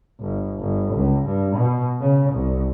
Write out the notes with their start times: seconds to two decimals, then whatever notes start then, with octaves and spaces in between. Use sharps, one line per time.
0.20 G1
0.60 G1
0.94 C#2
1.26 G2
1.56 B2
2.00 C#3
2.33 C2